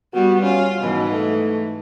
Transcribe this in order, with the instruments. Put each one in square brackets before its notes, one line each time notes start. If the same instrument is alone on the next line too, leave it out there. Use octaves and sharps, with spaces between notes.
[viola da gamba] G3 B3 [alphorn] F#4
[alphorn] C#4 [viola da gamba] F4
[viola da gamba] G#2 E3 [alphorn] B2
[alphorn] A3